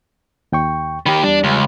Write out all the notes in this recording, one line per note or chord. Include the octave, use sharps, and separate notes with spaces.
D#2 G5 C#6
D#3 G4 B5
E2 G3 D4
C#2